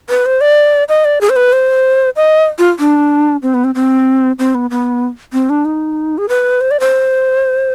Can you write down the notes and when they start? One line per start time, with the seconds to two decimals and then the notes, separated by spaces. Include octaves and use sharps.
0.09 B4
0.26 C5
0.41 D5
0.89 D#5
1.05 D5
1.21 G#4
1.30 C5
1.36 B4
1.53 C5
2.16 D#5
2.59 F4
2.79 D4
3.42 C4
3.54 B3
3.64 C4
3.75 C4
4.39 C4
4.55 B3
4.70 B3
5.33 C4
5.50 D4
5.65 D#4
6.18 G#4
6.29 B4
6.61 C5
6.71 D5
6.80 C5